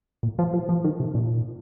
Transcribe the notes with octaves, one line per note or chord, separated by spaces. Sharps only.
A#2
F3
F3
F3
D#3
C3
A#2